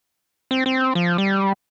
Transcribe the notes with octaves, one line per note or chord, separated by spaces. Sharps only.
C4
C4
F3
G3